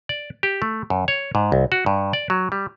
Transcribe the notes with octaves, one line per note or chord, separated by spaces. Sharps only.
D5
G4
A3
F#2
C#5
G#2
C2
F#4
G2
D5
F#3
G3